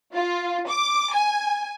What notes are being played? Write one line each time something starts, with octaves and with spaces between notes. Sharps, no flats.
F4
D6
G#5